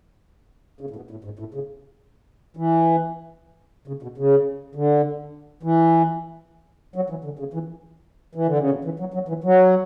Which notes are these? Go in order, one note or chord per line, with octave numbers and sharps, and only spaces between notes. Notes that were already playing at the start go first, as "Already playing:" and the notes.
C#3
A2
B2
A2
G#2
A2
C#3
E3
C#3
B2
C#3
D3
E3
F#3
E3
D3
C#3
E3
E3
D3
C#3
B2
E3
F#3
F#3
E3
F#3